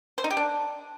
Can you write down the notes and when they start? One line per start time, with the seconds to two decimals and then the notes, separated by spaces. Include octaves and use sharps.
0.18 C5
0.24 D#4
0.30 G4
0.37 D4